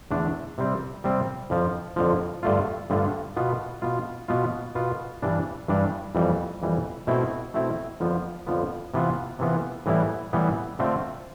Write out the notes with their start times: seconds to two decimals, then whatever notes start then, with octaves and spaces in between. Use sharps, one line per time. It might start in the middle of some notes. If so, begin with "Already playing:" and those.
0.11 E2 D3 A3 D4
0.58 C3 G3 C4
1.04 C3 G3 C4
1.50 F2 D3 F3
1.96 F2 D3 F3
2.43 G2 D3 A3 D4 F4
2.90 G2 D3 A3 D4 F4
3.37 B2 B3 F4
3.82 B2 B3 F4
4.28 B2 B3 F4
4.75 B2 B3 F4
5.22 G2 E3 G3 D4
5.68 G2 E3 G3 D4
6.15 F2 E3 G3
6.62 F2 E3 G3
7.07 B2 A3 C4 E4
7.54 B2 A3 C4 E4
8.00 F2 D3 F3 B3
8.47 F2 D3 F3 B3
8.94 C3 E3 B3 F4
9.39 C3 E3 B3 F4
9.86 A2 E3 G3 B3 E4
10.33 A2 E3 G3 B3 E4
10.79 D3 A3 C4 F4